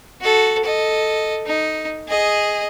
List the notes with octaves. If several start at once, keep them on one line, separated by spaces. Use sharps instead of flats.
F#4 A4
A4 D#5
D#4
G#4 D#5